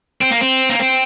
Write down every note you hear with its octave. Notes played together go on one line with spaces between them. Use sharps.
C4
A#3
C4
A#3
C4